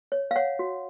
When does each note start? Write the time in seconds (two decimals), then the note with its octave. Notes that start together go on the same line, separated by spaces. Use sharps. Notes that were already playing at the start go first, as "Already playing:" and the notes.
0.12 C#5
0.31 F5
0.36 C#5 F#5
0.59 F#4